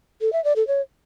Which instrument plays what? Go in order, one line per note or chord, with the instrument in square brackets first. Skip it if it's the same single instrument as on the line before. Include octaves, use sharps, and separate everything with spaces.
[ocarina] A4
E5
D5
A4
C#5